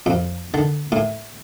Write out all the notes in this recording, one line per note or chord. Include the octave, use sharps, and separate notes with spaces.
F2
D3
A2